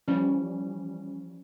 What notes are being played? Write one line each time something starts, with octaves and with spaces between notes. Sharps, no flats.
E3 F3 G3 C#4